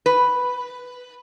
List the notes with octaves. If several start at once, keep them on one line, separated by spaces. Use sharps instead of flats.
B4